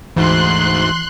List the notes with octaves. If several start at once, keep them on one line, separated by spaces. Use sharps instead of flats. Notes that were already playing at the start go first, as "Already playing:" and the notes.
D2 G#2 E3 C6 F#6